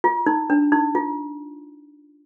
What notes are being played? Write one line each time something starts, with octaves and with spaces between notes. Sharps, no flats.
F4
D#4
D4
D#4
F4